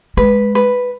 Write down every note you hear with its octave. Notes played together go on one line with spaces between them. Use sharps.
G#3 B4
B4